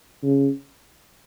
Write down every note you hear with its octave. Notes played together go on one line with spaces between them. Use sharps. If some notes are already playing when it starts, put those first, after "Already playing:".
C#3